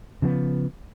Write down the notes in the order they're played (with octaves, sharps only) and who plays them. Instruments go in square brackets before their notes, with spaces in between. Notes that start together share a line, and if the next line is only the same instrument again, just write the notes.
[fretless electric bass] C#3 F3 B3